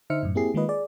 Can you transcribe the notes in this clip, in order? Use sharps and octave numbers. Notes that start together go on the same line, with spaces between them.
D3 D#4 C5 E5 F6 C#7
F#2 A2
A#3 C4 E4 G4 G#4 C7
D#3 G#3 A#3 F4 B4 D#5
G#4 D5